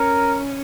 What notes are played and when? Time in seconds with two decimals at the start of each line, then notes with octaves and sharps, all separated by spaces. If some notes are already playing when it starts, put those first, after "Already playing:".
Already playing: C#4 A#4